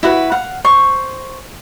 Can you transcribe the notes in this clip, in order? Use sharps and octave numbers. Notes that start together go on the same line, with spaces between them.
E4 F#4 B4
F5 F#5
C5 C#6